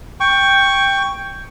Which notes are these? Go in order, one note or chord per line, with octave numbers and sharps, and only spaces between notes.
G5 C#6